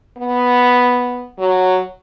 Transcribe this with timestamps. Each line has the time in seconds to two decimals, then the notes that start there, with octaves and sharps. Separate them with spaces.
0.18 B3
1.39 F#3